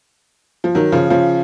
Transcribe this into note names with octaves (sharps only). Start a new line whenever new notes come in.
F3
D#3 F#3
C#3 F3
C#3 F3